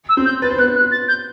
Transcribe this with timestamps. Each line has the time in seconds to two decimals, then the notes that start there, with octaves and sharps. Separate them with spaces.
0.09 E6
0.17 C4 C5
0.26 G6
0.42 B4 A6
0.50 C5
0.58 B3 B4 F#6
0.75 F#6
0.92 A6
1.08 G6